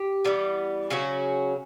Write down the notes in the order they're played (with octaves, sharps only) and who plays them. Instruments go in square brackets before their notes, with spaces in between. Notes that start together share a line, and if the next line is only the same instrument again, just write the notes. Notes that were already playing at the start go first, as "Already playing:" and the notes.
Already playing: [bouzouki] G4
E3 G3 B3
C#3 F#3 C#4 F#4